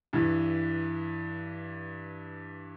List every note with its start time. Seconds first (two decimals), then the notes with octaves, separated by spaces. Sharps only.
0.13 G2 E3